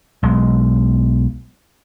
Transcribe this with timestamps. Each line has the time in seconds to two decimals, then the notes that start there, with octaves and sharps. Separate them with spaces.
0.23 B1 G#3